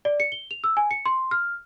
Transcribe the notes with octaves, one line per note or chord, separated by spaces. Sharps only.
D5
C#7
G7
F7
E6
G#5
C#7
C6
F6